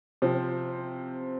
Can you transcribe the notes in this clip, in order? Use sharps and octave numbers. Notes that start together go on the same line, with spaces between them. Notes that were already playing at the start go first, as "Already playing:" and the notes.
C3 F3 C4